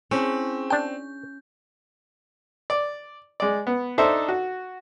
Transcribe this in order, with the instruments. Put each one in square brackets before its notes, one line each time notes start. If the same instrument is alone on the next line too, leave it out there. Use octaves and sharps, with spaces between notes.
[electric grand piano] C4 [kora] C#4 [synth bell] E4 G#4 C#6
[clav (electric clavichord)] D4 G5 [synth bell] G6
[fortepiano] D5
G#3 D5
B3
D4 D#4 A4 C5 E5
F#4